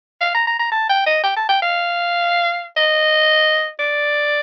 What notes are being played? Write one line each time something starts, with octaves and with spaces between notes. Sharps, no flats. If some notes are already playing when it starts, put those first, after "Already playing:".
F5
A#5
A#5
A#5
A5
G5
D#5
G5
A5
G5
F5
D#5
D5